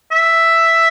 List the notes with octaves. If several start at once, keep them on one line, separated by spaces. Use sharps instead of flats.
E5